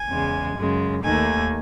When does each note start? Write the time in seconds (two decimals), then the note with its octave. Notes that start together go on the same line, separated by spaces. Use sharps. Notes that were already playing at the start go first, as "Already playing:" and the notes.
Already playing: G#5
0.09 E2 C#3 G#3
0.56 F#2 C#3 G#3
1.03 D#2 D#3 A3 G#5